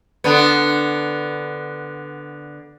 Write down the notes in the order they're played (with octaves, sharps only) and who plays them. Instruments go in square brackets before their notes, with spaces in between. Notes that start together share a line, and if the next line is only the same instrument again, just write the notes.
[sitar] D3 B3